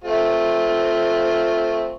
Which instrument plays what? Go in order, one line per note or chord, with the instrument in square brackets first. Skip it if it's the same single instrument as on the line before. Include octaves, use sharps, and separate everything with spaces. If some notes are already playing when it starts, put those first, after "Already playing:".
[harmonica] A3 C4 F4